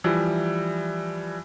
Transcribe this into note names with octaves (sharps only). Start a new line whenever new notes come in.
E3 F3 G3